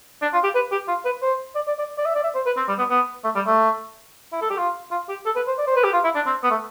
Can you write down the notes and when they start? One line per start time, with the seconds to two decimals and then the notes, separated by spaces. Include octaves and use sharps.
0.22 D4
0.33 F4
0.44 G4
0.55 B4
0.72 G4
0.88 F4
1.05 B4
1.22 C5
1.55 D5
1.68 D5
1.78 D5
1.98 D5
2.05 E5
2.15 D5
2.23 E5
2.35 C5
2.46 B4
2.57 C4
2.68 G3
2.78 B3
2.90 B3
3.24 A3
3.35 G3
3.46 A3
4.32 E4
4.41 A4
4.50 G4
4.58 F4
4.91 F4
5.09 G4
5.25 A4
5.36 B4
5.47 C5
5.58 D5
5.67 C5
5.76 B4
5.84 G4
5.93 F4
6.04 E4
6.15 D4
6.26 C4
6.43 B3
6.50 A3